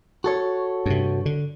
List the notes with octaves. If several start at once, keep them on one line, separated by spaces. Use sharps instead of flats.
F#4 A4 C#5
G2 C3
D3